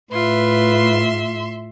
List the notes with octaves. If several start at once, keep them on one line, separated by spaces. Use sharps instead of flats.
A2 F4 B4 E5 C6